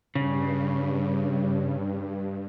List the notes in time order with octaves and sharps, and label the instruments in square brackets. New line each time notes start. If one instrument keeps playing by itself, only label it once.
[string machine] G2 [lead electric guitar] C#3